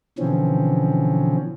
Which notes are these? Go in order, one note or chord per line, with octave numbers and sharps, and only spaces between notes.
B2 D3 E3 F3 C4 C#4